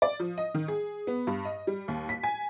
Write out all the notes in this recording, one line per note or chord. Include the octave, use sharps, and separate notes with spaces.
D5
F3
D#5
D#3
G#4
B3
G2
D#5
G3
D#2
B6
G#5